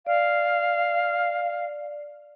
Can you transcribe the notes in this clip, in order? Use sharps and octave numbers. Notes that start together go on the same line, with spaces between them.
D5 F5